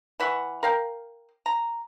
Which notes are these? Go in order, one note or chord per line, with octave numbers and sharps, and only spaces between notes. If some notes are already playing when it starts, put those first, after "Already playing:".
E3 E5 F#5 C#6
A#4 F5 G5
A#5